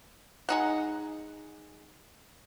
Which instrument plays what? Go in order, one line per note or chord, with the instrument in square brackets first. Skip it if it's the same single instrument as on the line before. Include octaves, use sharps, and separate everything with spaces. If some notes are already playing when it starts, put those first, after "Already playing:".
[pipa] G#3 D#4 F#5